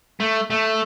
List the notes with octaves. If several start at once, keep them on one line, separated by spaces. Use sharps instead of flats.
A3
A3